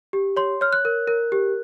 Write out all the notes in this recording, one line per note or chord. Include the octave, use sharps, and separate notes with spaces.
G4
C#5 C6
C#5 F6
F#6
A#4
A#4
G4